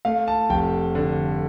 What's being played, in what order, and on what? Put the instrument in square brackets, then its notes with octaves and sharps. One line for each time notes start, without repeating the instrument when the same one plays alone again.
[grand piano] A3 F5
A5
F1 G5
D3